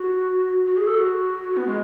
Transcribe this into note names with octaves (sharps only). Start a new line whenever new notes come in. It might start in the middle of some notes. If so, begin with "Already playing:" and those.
Already playing: F#4
F#4
G#4
A4
F#4
B3
G#3